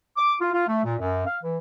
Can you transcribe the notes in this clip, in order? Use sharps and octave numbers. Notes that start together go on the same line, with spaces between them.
D6
F4
F4
A3
A#2
F#2
F5
E3